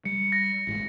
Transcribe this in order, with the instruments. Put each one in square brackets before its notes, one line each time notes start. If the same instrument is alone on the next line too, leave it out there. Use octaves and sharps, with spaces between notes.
[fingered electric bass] G3 [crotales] C#7
[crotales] A#6
[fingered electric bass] A1 G#2